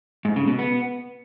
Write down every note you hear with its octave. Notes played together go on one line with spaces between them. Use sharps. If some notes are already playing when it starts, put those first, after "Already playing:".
G#2
C#3
B2
B3